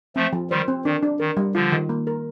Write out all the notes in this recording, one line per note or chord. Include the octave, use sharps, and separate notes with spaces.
F3 A3 C4
F3
D#3 G3 C5
C4
D#3 D4
D4
D#3 A#4
G3
D3 F3 F4
D#3
A#3
A#4